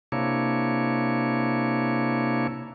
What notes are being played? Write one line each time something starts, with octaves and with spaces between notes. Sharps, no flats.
C3 A#3 D4 E4 C#5